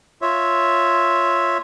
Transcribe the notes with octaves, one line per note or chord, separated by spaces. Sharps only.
F4 C#5 E5